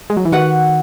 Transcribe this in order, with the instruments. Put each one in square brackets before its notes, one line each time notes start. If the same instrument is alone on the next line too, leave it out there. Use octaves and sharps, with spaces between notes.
[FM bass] G#3
F#3
E3
[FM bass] D#3 [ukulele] F#4 B4 F#5